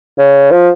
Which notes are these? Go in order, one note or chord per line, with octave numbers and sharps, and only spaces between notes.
C#3
F3